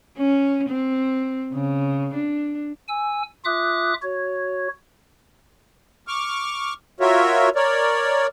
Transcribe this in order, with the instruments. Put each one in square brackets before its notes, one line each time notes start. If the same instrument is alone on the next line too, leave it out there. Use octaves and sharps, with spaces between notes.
[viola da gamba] C#4
C4
C#3
D4
[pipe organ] G#5 E6
F4 E5 D6 D#6 F#6
F#4 C#5
[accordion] C#6 D6 F6
F4 F#4 A#4 C#5 E5
A#4 C#5 D5